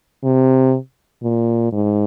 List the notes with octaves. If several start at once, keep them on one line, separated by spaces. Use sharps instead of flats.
C3
A#2
G#2